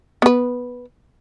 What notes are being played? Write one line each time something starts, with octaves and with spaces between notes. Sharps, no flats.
B3 B4